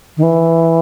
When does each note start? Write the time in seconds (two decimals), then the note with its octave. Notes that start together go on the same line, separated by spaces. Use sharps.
0.17 D#3
0.23 E3